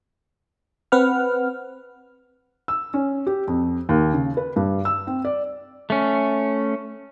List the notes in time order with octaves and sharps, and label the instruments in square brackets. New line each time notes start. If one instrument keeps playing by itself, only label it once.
[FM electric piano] C4 B4 F#5 F6
[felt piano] E6
C#4
G4
F2
D#2
C#3
B4
G2
E6
C4
D5
[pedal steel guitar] A3 C#4